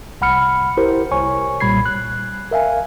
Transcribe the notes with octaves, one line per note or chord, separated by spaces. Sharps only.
C2 F#5 B5 F6 C#7
E4 G4 A#4 C5
C2 C#5 G#5 C#6
B1 A#2 G3 B5 G#6 C7
F#6
A#4 E5 F5 G#5